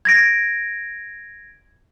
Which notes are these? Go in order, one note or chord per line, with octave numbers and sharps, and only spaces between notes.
G#6 A#6 D7